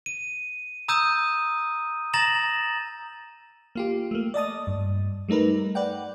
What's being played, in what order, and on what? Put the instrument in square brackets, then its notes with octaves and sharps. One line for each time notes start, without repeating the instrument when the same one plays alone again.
[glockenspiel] D#7
A#5 D#6 E6 G6 D#7
A#5 A6 A#6 E7 F#7
[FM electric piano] A#3 F4 G4
A3 A#3
D5 D#5 A5 D#6
G2
G3 A3 D#4 A#4 B4
B4 D5 F#5 G5